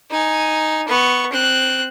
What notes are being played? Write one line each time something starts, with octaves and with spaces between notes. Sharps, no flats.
D#4 G#5
B3 C#6
C4 F#6